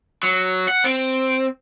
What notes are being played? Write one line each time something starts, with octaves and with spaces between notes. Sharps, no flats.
F#3
F#5
C4